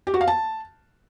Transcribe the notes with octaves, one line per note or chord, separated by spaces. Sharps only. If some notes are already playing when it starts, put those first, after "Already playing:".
G4
F#4
F5
A5